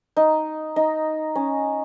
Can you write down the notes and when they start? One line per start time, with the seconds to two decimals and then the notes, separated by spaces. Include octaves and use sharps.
0.16 D#4
0.76 D#4
1.35 C#4